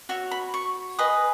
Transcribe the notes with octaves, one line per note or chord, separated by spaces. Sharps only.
F#4 C#5 E5
B5
C#6
G#4 B4 D#5 D#6